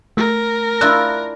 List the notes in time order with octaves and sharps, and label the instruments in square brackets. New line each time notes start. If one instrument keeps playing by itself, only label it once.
[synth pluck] A3 [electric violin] A#4
[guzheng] D4 E4 F4 [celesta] F#6